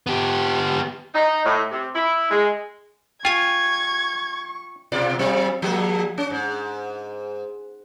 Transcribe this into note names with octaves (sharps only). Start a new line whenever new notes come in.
B3 G4
D#4
A2
C3
E4
G#3
F4 G5 G#5 C#6 G#6
B2 F4 D5
F#3 C4
F3 G#3 A#3
C#4
G#2